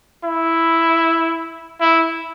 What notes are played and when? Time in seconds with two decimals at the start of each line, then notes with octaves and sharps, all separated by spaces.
0.25 E4
1.81 E4